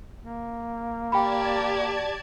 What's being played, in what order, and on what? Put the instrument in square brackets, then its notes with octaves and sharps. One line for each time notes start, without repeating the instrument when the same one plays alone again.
[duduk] A#3
[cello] G4 [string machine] D5 A5 G#6 [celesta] G5 B5